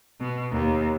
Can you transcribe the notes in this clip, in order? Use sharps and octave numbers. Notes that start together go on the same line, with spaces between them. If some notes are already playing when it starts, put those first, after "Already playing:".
B2
D#2